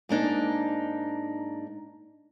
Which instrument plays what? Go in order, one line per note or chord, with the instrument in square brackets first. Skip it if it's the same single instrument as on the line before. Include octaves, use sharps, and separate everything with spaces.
[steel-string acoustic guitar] G#2 A#3 D4 D#4